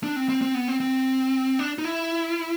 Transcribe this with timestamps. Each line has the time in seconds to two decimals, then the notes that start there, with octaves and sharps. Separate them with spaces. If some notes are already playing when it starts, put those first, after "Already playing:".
0.03 D4
0.16 C4
0.29 C4
0.42 C4
0.55 B3
0.68 C4
0.80 C4
1.59 D4
1.78 D#4
1.85 E4